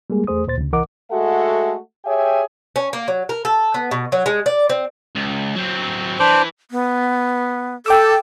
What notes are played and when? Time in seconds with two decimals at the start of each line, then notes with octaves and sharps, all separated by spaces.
0.10 G3 G#3 A#3 G#4
0.27 E2 A3 G#4 C5 D#6
0.47 D2 A#2 C5 A6
0.58 D2 C#3
0.73 C2 E3 A#4 D#5 F#5 D6
1.11 G#3 A3 F#4 A4 E5 F#5
2.05 G4 G#4 C#5 E5 G5 G#5
2.76 C#4
2.93 A#3
3.08 F#3
3.29 A#4
3.45 A4
3.74 B3
3.91 B2
4.12 F#3
4.26 G#3
4.46 D5
4.69 C4
5.16 C#2
5.56 F#3 C4
6.20 E3 D4 C5 D6
6.71 B3
7.86 A4 G5 D6 E6